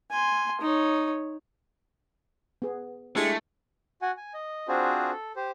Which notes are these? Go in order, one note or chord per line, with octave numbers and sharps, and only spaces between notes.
G#5 C6
D#4 C#5
B3 G#4
G#3 A3 D4 E4 G4
F#4 F#5 G#5
G#5
D#5
C4 D4 F4 F#4 G#4 C5
A4
G4 C5